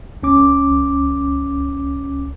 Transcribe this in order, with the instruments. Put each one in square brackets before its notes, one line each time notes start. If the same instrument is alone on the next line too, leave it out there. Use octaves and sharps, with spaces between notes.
[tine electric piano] C#2 C#4 D6